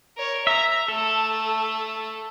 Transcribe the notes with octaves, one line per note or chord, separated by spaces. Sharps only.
A#4 C#5
E5 A#5
A3 A4 A5